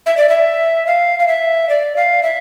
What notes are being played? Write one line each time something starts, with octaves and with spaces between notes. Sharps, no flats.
E5
D5
E5
F5
F5
E5
D5
F5
E5